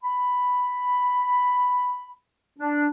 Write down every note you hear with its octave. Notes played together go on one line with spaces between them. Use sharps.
B5
D4